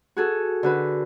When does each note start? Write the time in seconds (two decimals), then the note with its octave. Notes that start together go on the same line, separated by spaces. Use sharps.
0.17 F#4 G#4 A4
0.63 D3 F#4 B4